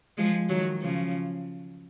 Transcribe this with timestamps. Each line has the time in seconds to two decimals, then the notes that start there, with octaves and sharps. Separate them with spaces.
0.18 F3 G#3
0.49 D#3 F#3
0.82 C#3 F3